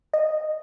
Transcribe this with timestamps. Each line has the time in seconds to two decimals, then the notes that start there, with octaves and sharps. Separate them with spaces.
0.13 D#5